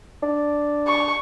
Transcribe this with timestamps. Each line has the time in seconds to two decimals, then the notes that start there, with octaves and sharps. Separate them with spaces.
0.23 D4
0.88 C#6